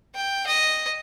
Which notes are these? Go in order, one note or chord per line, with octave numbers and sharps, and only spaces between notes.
G5
D#5